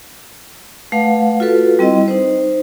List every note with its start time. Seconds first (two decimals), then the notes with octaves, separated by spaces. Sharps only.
0.92 A3 B4 F5 F#5
1.40 F4 F#4 A4 B4
1.79 G3 C4 E4 D#5
2.08 D#4 C5